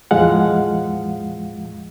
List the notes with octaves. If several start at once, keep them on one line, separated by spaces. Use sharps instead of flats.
E2 A2 F3 G#3 F5 F#5